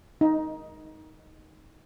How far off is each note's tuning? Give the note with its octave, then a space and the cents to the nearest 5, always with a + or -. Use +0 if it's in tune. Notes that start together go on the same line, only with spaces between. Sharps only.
D#4 +10